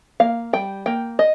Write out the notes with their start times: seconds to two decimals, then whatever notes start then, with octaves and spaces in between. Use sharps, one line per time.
0.20 A#3 F5
0.53 G3 G5
0.86 A#3 G5
1.19 D#5